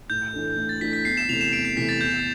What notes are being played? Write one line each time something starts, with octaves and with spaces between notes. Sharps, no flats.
A2 G6
E3 A3 D4 A4
A2
A6
E3 A3 D4 A4 B6
B6
E2 C7
E7
C3 E3 A3 F7
E7
E2 D7
C7
C3 E3 A3 B6
A6
E2 G6